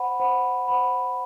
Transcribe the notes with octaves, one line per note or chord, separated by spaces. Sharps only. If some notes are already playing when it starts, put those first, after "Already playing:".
Already playing: C5 F#5 B5
C5 F#5 B5
C5 F#5 B5